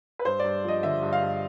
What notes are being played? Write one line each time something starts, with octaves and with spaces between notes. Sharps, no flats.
B4
G2 C5
G2 D5
F3 D#5
D3 E5
G2
F5
G2